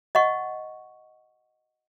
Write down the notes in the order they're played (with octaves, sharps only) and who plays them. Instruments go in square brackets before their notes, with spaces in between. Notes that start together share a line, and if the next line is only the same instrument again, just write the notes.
[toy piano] D#5 F#5 C#6